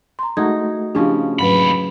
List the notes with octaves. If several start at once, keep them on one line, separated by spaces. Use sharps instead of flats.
A#5 C6
G#3 A3 D#4 F#4 G#6
C#3 F3 C#4 D4 E4 G4
D#2 G#2 F#3 B4 B5